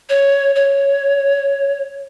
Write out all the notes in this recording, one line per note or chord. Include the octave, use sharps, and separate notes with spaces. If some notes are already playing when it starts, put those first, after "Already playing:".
C#5
C#5